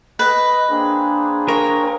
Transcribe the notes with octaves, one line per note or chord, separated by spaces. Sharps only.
B4 D#5
A#3 C4 D4 G#4
A#4 C#5